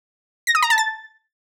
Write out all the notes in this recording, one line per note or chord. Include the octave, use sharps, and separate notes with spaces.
A#6
D#6
A#5
A5
A6